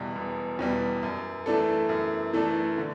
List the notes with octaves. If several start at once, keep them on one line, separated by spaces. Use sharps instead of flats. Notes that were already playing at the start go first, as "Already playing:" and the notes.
Already playing: E1 E2 B2 G3
E1
E2 B2 G3
F#2
E3 A3 D4 A4
F#2
E3 A3 D4 A4
D3